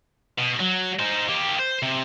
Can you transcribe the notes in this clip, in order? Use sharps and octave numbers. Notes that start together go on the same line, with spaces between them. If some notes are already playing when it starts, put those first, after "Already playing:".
B2
F#3
D#4 C5
A#3 G4
C5
C3